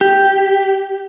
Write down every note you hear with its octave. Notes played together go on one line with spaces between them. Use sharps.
G4